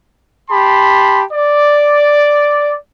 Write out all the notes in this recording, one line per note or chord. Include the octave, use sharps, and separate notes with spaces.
G4 A5 B5 C6
D5